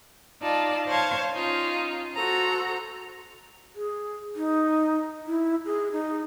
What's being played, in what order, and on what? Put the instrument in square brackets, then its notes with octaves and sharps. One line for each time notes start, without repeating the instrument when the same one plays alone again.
[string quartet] D#4 F4 D5 A5
C5 C#5 F5 A5 G#6
C#4 D#4 F4
F#4 A4 C5 A#5
[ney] G#4
D#4
E4
G#4
D#4